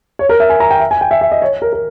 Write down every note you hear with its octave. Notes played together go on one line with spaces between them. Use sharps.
C#5
A#4
E5
G#5
A#5
G5
E5
G#5
G5
E5
E5
D#5
C#5
A#4
A#4